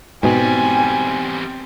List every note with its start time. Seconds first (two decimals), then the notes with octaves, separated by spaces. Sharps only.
0.23 E2 G#2 B2 G3 C4 G#5